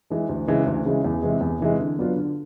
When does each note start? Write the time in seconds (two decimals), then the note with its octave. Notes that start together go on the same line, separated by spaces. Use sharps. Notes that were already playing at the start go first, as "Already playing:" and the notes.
0.10 E3 G#3
0.29 D2
0.47 C#3 E3 G#3
0.66 D2
0.85 C#3 E3 G#3
1.04 E2
1.22 C3 E3 G#3
1.41 E2
1.60 C3 E3 G#3
1.79 D3
1.98 F#3 B3 D4 F4
2.16 D3